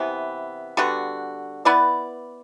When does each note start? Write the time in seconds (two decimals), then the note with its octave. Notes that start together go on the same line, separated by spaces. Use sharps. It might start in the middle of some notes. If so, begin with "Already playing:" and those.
Already playing: C3 E3 B3
0.77 D3 G3 B3 F#4
1.65 B3 E4 B4 D5